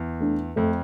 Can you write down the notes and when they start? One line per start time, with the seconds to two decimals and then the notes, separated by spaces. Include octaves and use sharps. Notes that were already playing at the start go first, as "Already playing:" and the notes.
Already playing: E2
0.20 A3 D4
0.56 F2 A3